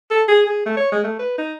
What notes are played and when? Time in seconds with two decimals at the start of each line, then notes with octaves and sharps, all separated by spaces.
0.11 A4
0.28 G#4
0.46 G#4
0.66 A3
0.77 C#5
0.92 G#3
1.04 A3
1.19 B4
1.38 D#4